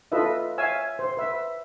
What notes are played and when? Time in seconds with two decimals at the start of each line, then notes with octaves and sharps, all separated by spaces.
0.12 F4 A4 B4 D#5 E5
0.58 C#5 E5 F5 G#5 E6
0.99 C5
1.17 B4 E5